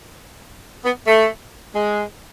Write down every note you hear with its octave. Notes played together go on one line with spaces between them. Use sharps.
B3
A3
G#3